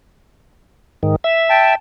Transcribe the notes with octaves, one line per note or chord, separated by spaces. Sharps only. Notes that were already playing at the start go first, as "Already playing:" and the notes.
G#2 D#3
E5
G5 A5